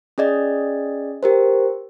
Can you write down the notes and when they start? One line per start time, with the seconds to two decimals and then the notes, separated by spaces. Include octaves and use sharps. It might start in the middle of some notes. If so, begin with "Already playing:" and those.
0.18 C#4 G#4 D5 D#5
1.23 G4 A#4 C5